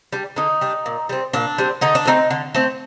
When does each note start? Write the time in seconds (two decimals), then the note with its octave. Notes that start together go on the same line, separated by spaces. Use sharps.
0.12 G3 D4
0.36 D3 D#4
0.61 G3 D4
0.86 A#2
1.09 G3 C4
1.33 A#2 D4
1.58 G3 C4
1.81 D3 D#4
1.95 D4
2.05 A3 C4 D#4
2.30 D3
2.55 A3 C4